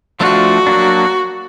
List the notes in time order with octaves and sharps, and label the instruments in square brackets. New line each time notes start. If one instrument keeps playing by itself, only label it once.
[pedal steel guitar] F3 A3 D4 F4 [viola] F#4
[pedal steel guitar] F#3 A#3 D4